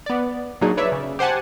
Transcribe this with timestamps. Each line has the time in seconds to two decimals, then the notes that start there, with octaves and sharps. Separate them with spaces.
0.06 B3 D5
0.61 A#2 F#3 D4 D#4 G#4
0.77 B4 C#5 D5 E5
0.92 C#3
1.19 G4 C5 F#5 G#5 A5